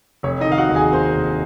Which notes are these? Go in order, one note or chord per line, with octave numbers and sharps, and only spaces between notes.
F1 C#5
D#4 D#5
D#3
F5
F#4 F#5
D#2
G#4 G#5
A#3 C5 C6
F1